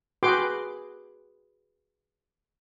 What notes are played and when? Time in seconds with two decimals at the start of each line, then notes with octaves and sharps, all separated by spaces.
0.23 F#4 G#4 B4 G5 C6 D6